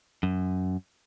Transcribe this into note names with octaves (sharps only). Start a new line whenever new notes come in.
F#2